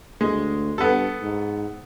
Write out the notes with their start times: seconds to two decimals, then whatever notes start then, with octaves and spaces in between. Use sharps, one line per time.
0.21 D2 G#3
0.78 G2 B3 A4
1.22 G#2